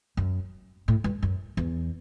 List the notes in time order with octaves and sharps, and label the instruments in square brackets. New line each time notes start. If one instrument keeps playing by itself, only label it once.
[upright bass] F#2
A2
G2
F#2
E2